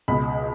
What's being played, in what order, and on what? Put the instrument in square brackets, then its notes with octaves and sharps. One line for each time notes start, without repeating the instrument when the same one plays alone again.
[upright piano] C#2 B2 B5